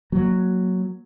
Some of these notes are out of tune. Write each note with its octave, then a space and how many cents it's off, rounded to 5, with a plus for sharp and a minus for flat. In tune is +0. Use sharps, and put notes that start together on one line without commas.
F#3 +0 A#3 +0